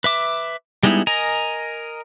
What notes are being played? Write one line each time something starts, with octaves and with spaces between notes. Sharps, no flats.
B4 E5 D6
G3 G#3 B3 D#4 E4
A#4 D#5 G#5 A#5